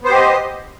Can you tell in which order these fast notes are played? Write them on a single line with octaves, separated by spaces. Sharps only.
B3 C5 G4 D#5